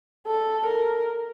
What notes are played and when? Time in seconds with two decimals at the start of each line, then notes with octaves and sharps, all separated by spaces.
0.27 A4
0.66 A#4